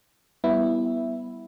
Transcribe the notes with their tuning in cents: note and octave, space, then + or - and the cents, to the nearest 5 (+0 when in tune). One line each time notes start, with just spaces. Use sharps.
G3 -10 B3 +0 E4 +0